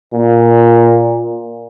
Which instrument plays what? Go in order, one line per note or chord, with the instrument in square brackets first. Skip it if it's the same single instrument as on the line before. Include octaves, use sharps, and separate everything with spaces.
[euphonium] A#2